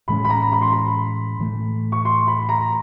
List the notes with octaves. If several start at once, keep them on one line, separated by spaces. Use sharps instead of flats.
A2 E3 G#3 C#4 B5
B5
A#5
B5
C6
B5
A2 E3 A3
C#6
C6
B5
A#5